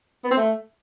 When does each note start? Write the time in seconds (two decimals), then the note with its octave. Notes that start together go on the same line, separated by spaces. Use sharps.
0.24 B3
0.31 C4
0.37 A3